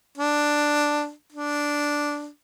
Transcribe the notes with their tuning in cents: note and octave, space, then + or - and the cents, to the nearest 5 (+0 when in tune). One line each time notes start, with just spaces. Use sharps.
D4 +5
D4 -5